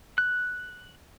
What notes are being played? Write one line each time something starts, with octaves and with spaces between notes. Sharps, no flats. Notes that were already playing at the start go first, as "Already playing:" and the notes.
F#6